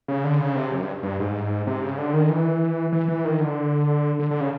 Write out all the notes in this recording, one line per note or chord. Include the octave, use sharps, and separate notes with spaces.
C#3
D3
C#3
C3
F#2
G2
G2
G#2
C3
C#3
D3
D#3
E3
E3
E3
D#3
D3
D3
D3
C#3